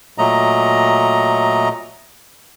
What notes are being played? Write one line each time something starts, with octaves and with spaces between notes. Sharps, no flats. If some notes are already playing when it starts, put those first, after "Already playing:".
A#2 F#3 A3 D#5 A#5